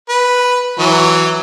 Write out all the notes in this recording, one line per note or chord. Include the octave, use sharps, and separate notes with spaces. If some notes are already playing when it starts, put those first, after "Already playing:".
B4
E3 F#3